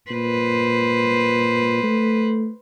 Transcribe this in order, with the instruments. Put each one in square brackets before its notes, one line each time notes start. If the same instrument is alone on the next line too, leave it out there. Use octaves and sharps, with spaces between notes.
[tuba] A#2 [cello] B4 C5
[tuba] A3